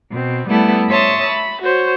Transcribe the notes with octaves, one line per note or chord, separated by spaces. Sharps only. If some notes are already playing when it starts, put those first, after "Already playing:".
B2 C4
G3 A3 B3 E4 A4
C#5 E5 A5 C6 D#6
B5
F#4 C5 C#5